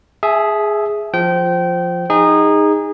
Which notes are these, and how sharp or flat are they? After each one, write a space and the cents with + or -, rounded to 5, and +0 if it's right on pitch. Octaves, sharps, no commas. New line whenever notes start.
G#4 +0 E5 +0 A5 -45
F3 +0 G5 -25
D#4 +0 G#4 -25